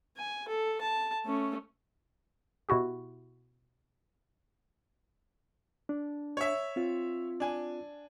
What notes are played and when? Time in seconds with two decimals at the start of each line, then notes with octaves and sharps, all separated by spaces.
0.17 G#5
0.48 A4
0.82 A5
1.25 A3 C#4
2.69 B2 E4 F#4 G4
5.89 D4
6.37 C#5 E5
6.76 C4 F4
7.40 D4 G#5